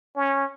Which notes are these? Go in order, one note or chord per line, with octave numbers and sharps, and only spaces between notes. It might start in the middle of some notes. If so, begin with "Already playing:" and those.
C#4